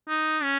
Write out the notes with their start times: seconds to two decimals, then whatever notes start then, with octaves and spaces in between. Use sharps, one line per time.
0.08 D#4
0.43 C#4